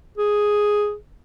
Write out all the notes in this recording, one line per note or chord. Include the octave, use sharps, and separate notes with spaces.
G#4